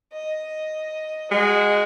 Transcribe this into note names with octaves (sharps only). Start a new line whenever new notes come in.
D#5
G#3 F#4